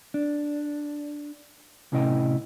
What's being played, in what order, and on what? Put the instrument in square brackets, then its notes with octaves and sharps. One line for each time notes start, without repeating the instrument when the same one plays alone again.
[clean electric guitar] D4
A2 C3 C#4 E4 D#5 G5